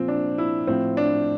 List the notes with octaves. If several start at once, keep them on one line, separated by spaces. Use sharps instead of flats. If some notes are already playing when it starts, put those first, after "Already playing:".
Already playing: A#2 F3 C4
D4
E4
A2 F3 C4
D4